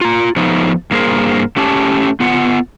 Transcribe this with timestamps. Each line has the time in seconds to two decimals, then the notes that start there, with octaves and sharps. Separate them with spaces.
0.01 F4 A#5
0.36 F3 A3 B3 D#4
0.91 G2 A#3 G#4 A#4 C5
1.56 A3 C#4 G4 A5
2.20 B3 F4 F#5